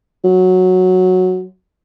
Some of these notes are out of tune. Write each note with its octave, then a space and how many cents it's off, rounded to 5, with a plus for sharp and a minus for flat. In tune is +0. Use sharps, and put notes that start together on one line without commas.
F#3 -5